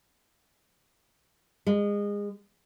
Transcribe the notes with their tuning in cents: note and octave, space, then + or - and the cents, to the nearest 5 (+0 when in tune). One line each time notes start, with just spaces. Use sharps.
G#3 -25